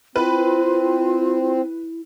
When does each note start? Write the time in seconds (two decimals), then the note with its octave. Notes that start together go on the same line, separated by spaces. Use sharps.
0.16 C4 E4 F4 B4